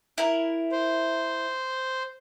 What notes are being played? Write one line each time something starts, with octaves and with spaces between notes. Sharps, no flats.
E4 A#4
C5